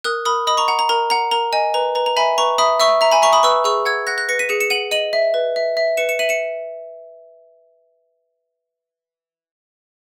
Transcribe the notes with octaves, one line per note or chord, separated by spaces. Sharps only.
A#4 D#6 F#6
A#4 B5 D#6
D#5 B5 D#6
A#5 C#6
F#5 A#5
A#5
A#4 A#5
F#5 A#5
A#4 A#5
D#5 G#5
B4 A#5
B4 A#5
A#5
E5 G#5 B5
B4 A#5 C#6
E5 B5 D#6
E5 C#6 E6
E5 A#5
G#5 B5
E5 A#5 C#6
B5 D#6
B4 C#6 E6
G#4 C#6 E6
F#5 E6 G#6
F#5 F#6 A#6
F#6 A#6
B4 A#6 C#7
B6 D#7
G#4 C#7 E7
C#7 E7
F#5 D#7 F#7
D#5 D#7 F#7
E5
B4
E5
E5
B4 C#7 E7
C#7 E7
E5 D#7 F#7
C#7 E7